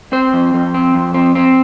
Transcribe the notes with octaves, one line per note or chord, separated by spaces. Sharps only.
C4 C5
F2
F2
C4
F2
C4
C4